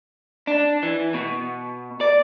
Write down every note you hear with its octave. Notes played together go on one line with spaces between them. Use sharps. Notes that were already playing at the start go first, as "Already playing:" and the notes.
D4
E3
B2
D5